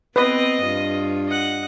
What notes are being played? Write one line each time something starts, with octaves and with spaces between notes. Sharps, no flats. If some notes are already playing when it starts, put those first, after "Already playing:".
B3 C4 B4 D#5 D#6
G2 F4
D#5 F#5